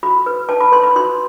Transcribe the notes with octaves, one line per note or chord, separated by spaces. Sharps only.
F#4 B5
B4
B4 A5
B5
B4 C6
B5
F#4 C6